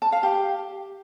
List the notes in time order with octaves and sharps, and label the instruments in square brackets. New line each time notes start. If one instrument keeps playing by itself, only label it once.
[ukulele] A5
F5
G4